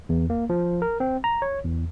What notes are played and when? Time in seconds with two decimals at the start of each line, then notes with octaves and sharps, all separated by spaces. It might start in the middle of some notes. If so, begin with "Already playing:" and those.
0.09 E2
0.30 A#3
0.50 F3
0.82 A#4
1.00 C4
1.24 A#5
1.42 C#5
1.65 E2